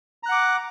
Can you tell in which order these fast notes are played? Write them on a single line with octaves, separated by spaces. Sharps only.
A#5 F#6 F#5 D6